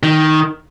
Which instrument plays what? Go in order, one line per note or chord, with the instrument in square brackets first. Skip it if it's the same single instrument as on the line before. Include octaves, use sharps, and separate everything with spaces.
[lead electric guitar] D#3